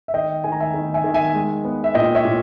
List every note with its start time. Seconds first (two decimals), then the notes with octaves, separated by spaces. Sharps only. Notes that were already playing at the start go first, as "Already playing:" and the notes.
0.08 E5
0.14 D#3 D#5 G5
0.44 D#3 G#5
0.52 A#5
0.60 E5 G#5
0.74 D#3
0.94 E5 G#5
1.04 D#3
1.14 E5 G#5
1.34 G#3
1.65 B3
1.84 E5
1.94 A#2 D#5 G5
2.15 C#5 E5
2.25 A#2